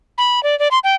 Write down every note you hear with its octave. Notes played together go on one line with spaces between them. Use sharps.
B5
D5
D5
C6
G5